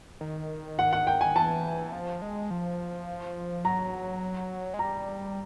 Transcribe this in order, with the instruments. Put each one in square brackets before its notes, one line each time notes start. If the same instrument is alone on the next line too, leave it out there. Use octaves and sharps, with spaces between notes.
[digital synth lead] D#3
[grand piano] F#5
F#5
G5
G#5
[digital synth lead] E3 [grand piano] A5
[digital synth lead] F3
G#3
F3
[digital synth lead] F#3 [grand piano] A#5
[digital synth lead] G#3
[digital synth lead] G3 [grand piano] A#5